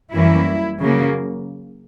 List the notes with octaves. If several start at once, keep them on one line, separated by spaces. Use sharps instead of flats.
F#2 E3 G3 A#3 C#4 E4
C#3 F#3 A#3